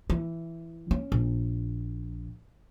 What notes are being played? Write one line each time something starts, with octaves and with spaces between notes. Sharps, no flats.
E3
C#4
A#1